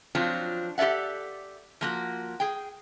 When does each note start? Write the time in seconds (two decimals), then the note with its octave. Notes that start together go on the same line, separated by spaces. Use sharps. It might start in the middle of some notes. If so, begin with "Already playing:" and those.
0.15 F3 F#3 C4 D4 F4
0.78 G4 A4 D5 E5 F#5
1.81 F3 A#3 F#4
2.40 G#4 G5